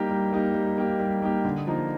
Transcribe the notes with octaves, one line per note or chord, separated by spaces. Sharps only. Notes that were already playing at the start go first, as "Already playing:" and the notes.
Already playing: G3 A#3 D#4 G4
G3
A#3 D#4 G4
G3
A#3 D#4 G4
G3
A#3 D#4 G4
D3
F3 A#3 D#4